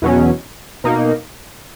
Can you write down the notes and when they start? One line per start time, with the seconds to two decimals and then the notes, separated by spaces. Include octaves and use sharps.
0.02 E2 B2 F#3 C#4
0.84 B2 A#3 D#4